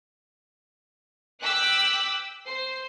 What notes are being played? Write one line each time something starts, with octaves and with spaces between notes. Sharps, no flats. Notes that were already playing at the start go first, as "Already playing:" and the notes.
G5 D6 E6 F#6 B6
C5 C7